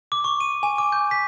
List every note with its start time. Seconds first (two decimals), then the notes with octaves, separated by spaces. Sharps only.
0.12 D6
0.24 C#6
0.40 D#7
0.63 G#5
0.78 D6
0.92 G6
1.11 B6